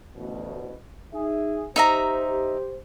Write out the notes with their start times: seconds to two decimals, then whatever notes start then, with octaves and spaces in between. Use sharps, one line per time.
0.15 A1 D2 B2
1.13 D#4 G#4 E5
1.76 D#4 G4 C5 E5 A#5